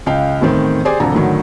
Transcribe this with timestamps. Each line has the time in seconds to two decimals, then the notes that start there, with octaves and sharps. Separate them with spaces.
0.06 C#2 F5 G5
0.41 E2 A2 D#3 C4
0.85 G4 G#4 C5 D5 G#5 D6
1.00 E1 F2 D3 A4 A#5
1.15 A2 D3 D#3 F#3